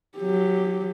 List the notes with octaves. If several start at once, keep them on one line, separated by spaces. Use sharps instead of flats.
F#3 G4